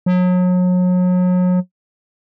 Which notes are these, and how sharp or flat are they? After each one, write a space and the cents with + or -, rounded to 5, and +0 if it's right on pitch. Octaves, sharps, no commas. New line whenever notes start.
F#3 -35